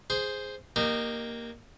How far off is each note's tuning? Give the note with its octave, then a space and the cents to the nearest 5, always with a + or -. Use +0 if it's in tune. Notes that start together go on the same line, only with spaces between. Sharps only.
G#4 +0 C5 +0
A#3 +0 D#4 -25 G4 +0